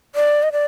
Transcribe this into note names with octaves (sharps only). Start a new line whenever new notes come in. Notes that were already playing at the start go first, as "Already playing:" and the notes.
D5
D#5
D5